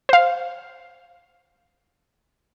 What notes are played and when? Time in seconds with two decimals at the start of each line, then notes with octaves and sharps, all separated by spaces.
0.09 C5 F5